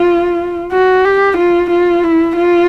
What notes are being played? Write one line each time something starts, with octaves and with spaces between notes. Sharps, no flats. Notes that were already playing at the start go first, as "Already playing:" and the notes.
Already playing: F4
F#4
G4
F4
F4
E4
F4